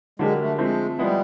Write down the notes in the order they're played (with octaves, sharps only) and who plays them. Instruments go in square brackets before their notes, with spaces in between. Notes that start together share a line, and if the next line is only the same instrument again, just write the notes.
[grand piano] D3 F#3 A#3 D4 G4 [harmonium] G#3
[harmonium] A3
[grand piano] F3 A3 C4 [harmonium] G#3
[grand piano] F3 G#3 B3 E4 [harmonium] G3